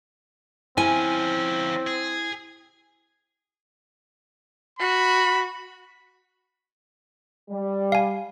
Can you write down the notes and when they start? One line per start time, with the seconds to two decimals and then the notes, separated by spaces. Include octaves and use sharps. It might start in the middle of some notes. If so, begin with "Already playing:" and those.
0.77 F3 C4 C#4 E4 G#5
1.87 G#4
4.79 F#4 B5
7.50 G3
7.92 F5 G#5